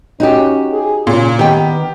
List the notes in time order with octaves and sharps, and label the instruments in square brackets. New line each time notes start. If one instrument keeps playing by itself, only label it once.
[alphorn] C#4 [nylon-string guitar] D#4 F#4 G4
[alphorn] G#4
[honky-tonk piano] A#2 [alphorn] C#3
[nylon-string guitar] D#3 G5 [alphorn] B3 [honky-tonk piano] G4